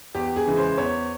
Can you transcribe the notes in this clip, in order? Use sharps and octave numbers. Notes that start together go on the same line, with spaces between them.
E2 G4
G#4
C#3 E3 G#3
C5
E2 C#5